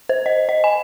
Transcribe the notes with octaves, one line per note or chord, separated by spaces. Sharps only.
C5
D#5
D#5
G#5